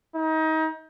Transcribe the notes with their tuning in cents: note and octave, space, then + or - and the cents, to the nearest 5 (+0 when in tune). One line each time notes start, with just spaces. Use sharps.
D#4 +30